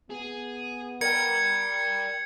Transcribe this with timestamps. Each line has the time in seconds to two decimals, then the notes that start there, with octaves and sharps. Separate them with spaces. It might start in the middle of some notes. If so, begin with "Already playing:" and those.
0.10 B3 G#4
1.01 A#4 D5 G5 G#6 C#7